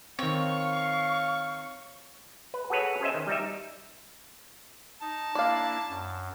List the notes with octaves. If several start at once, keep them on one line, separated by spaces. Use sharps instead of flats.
D#3 C4 C#5 F5 C#6
B4
F#4 G#4 A4 B4 C#5
C#4 G#4 C5 D#5 E5
D#3
G3 D#4 E5
D#4 A5
A#3 D4 E4 D5 F5
F#2